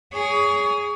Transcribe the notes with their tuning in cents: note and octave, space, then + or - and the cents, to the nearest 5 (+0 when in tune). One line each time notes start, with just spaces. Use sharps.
G#4 +0 C#5 +30